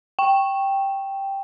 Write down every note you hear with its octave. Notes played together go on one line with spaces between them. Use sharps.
G5